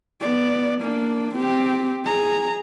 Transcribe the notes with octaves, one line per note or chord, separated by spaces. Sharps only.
B3 D5
A#3 D4
C4 G4
G#4 A#5